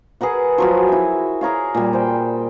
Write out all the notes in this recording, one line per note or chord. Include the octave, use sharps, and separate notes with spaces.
G#4 A#4 B4 F#5
F3 F#3 F#4
E4 E5
G#4 A#4 C#5 F5
A#2 G3
C5 G5